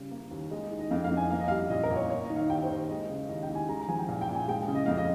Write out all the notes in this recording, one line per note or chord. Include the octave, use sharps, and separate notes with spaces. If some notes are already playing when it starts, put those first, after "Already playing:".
Already playing: C#3 G3
A#3
D#2
G#3 D#5
D#3
D#5
F2 F5
F5
F2
G#5
A#3 F5
D#5
G3 F5
A#2 D#5
A#4
A#2
C#5
A#3 C#5
D#5
D#3
F5
D#2 G5
C5
D#2
G#3 D#5
C#3
D#2 D#5
G5
D#2
G#5
G#3 A#5
A#5
F3 G#5
G5
A#2 F5
G5
A#2
G#5
G#3 G5
C#3
D#5
F2 F5
D#5